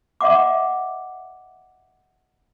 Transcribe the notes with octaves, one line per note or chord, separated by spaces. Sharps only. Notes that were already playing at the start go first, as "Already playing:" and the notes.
D#5 E5 F#5 D6